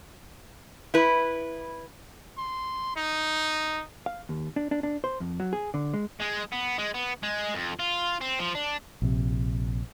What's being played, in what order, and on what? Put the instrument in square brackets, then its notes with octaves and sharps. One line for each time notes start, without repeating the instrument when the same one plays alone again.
[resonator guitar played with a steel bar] E4 B4
[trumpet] C6
D#4
[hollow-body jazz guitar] F5
D#2
D4
D4
D4
C5
F2
F#3
G#4
D3
G#3
[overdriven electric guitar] G#3
B3
G#3
B3
G#3
F2
F4
C4
F3
D4
[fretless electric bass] A#1 C3